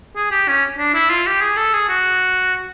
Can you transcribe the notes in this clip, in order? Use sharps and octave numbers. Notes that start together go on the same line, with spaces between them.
G#4
G4
C#4
D4
E4
F4
G4
G#4
A4
G#4
F#4